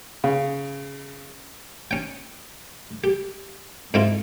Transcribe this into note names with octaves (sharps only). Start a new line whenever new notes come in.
C#3
C#4 G5
G4
G#2 G#3 C4 E4 F4